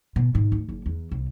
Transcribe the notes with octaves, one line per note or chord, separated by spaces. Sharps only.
B2
G#2
D2
F#1
E2
C2